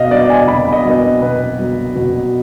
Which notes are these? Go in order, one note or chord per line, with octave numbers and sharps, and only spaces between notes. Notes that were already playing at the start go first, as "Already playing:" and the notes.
Already playing: B2 D#5 F5
F#3 B3 D5
G#5
B2 B5
D#5
F#3 B3
B2 B4
F#3 B3
B2